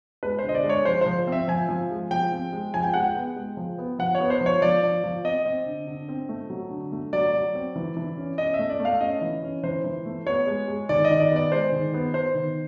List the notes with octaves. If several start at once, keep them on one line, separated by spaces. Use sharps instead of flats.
G#3 B4
C5
D3 D#5
D5
G#3
C#5
F3 C5
F3 C5
C4 E5
F3 G#5
F3
G#3
F3 G5
C4
G#3
F3 G#5
G5
G#3 F#5
G5
B3
G#3
F3
B3
F3 F#5
C#5
B3
C5
F3
C#5
F3 D5
F3
F3
C4 D#5
C4
D3
D3
C4
A3
F#3
D3
A3
F#3 D5
F#3
C4
E3
E3
C#4
C#4 D#5
E5
A3
D5
A3
F5
C#4 D#5
E3
C#4
E3 C5
E3
A3
B3 C#5
G#3
G#3
D#3 D5
D#5
D#3
D5
B3 D5
G#3 C5
D#3
B3
B3 C5
D#3